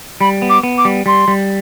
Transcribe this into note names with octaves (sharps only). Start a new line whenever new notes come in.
G3 B5
B3
D6
B3
D6
G3
G3 C6
G3